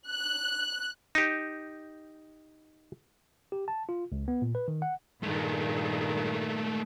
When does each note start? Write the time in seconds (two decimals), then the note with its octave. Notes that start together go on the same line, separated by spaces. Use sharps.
0.10 F#6
1.15 D#4 G4
3.52 G4
3.68 A5
3.89 F4
4.12 C#2
4.28 B3
4.42 A#2
4.55 B4
4.68 D#3
4.82 F#5
5.23 G2 A#2 D#3 G#3 A3